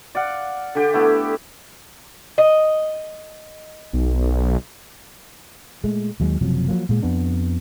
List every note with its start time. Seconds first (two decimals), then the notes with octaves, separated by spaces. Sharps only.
0.15 D5 F5 F#5
0.75 D3 G4
0.94 A3 B3 E4
2.38 D#5
3.93 B1
5.84 A#2 G#3 A3
6.20 D#2 F#3 G#3
6.41 F#1 C3 F3 F#3
6.68 F3 F#3 A#3
6.89 A#2 G#3
7.02 F2 B3 D4